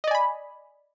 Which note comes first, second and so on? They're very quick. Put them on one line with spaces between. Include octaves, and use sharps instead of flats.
D#5 D5 G#5 B5